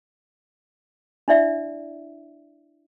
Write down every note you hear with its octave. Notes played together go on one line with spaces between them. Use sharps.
D4 E4 D5 E5